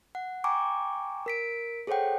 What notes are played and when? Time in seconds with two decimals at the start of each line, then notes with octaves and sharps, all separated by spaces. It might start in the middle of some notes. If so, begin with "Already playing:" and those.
0.15 F#5
0.44 G5 G#5 A#5 C#6 D6
1.26 A#4 B6 D7
1.87 G#4 A4 C5 C#5 F#5 G5